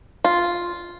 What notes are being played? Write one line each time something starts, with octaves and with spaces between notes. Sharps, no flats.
F4